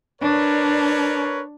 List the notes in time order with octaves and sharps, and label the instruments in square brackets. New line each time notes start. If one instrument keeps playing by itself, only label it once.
[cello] D4 [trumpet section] A#4 B4 C#5